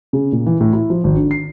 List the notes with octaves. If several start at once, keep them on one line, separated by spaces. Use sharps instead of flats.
C#3
A#2
E3
A2
E4
F3
G#1
D3
C7